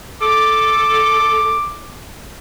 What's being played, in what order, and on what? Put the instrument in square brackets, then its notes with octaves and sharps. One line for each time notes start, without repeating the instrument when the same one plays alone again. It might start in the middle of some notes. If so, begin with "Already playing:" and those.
[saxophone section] A4 [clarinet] D6